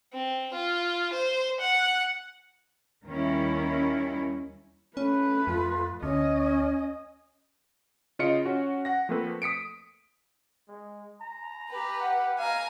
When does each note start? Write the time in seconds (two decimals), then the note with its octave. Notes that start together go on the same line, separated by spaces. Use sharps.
0.14 C4
0.54 F4
1.13 C5
1.60 F#5
3.06 D#2 D#3 G3 C#4 E4
4.97 A3 C#4 B4
5.47 F2 F4
6.03 D2 C#4 D#5
8.19 C#3 F4 D#5 C#7 D7
8.45 C#4 F#4
8.85 F#5 A#6
9.09 F3 A3 A#3 C4 A4 B4
9.42 D#6 B6 C#7 D7
10.68 G#3
11.21 A#5
11.70 G4 B4
12.01 F#5
12.38 F5 G#5 A#5